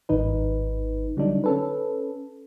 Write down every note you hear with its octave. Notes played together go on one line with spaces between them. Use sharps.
G#1 G2 D#3 D#4 B4
D3 F#3 G3 D4 D#4
C#4 A4 B4